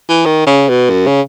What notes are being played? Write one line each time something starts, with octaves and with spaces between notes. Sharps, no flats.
E3
D#3
C#3
B2
F#2
C#3